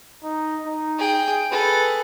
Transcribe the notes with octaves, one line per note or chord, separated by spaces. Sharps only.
D#4
D#4
G#4 G5
G#4 A4 B4